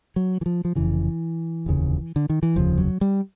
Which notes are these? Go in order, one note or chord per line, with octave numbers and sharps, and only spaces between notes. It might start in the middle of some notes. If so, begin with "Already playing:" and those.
F#3
E3
F3
F3
F1 F2 C#3 E3
F1 D#2 C#3
D3
D#3
E3
F1 D#2 C#3 F3
F#3
G3